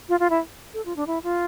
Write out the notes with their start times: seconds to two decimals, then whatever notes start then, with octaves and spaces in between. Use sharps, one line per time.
0.09 F4
0.20 F4
0.30 E4
0.74 A4
0.86 F4
0.96 D4
1.07 E4
1.23 F4